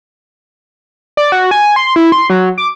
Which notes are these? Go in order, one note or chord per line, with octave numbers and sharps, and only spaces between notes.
D5
F#4
G#5
C6
E4
C6
F#3
D6